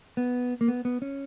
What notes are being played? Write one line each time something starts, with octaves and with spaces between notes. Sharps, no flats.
B3
A#3
B3
B3
C#4